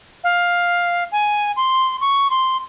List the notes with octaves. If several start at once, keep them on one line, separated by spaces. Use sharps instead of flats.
F5
G#5
C6
C#6
C6